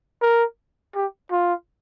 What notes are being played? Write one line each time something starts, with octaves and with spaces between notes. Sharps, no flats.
A#4
G4
F4